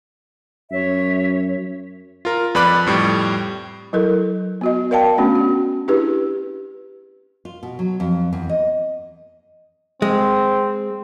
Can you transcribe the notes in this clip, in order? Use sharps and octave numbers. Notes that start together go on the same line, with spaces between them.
F#2 C#5 E5
F4 A#4
F2 B4 D5 B5 D6 F#6
F2 A2 G3
F#3 E4 A4 A#4
B3 F#4 D#5
A#4 D5 F5 G5 A5
A3 B3 C#4 D4 F#4
F#4
D4 E4 G4 G#4 B4
F4
B2
F#3
F2
E2
D#5
G#3 C4